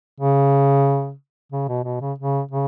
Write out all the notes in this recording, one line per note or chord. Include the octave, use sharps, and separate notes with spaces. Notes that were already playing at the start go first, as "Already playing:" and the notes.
C#3
C#3
B2
B2
C#3
C#3
C#3